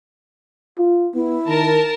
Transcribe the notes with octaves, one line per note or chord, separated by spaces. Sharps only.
F4
B3 E4
D#3 A#4 A5